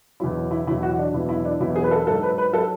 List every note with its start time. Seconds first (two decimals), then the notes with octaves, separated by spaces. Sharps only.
0.20 E2 B2 F#3 E4
0.51 E4
0.67 E2 B2 F#3 E4
0.83 F#4
0.98 D4
1.13 E2 B2 F#3 E4
1.29 E4
1.45 D4
1.60 E2 B2 F#3 E4
1.76 G#4
1.84 B4
1.91 A4
2.07 G#2 F#3 A4
2.23 B4
2.38 B4
2.53 F#3 A4